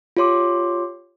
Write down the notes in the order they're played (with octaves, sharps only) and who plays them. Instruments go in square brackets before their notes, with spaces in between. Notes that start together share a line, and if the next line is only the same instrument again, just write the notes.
[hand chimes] F4 G4 C#5 C6 D6